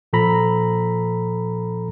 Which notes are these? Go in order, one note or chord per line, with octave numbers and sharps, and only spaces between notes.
A#2 F3 A4 A#5 B5 A#6